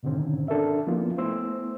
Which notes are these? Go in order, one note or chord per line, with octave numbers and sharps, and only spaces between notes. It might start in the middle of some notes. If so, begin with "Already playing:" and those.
G#2 B2 D3 D#3 C4 C#4
D4 A4 A#4 E5
F3 A#3 B3 C#4 E4 F4
A3 B3 E4 C5 E6